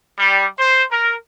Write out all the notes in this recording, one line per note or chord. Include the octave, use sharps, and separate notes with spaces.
G3
C5
A#4